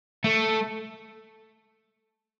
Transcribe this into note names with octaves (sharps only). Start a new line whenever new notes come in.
A3